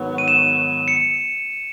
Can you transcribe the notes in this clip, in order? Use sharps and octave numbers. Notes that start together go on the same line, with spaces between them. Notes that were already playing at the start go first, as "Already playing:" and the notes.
Already playing: G#2 D#3 F#3 B3
D#7
E7
C#7